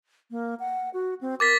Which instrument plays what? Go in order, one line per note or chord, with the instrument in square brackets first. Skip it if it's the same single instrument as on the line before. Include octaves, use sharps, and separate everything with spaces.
[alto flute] A#3
F#5
F#4
C4
[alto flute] A#4 [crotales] D6 A6 B6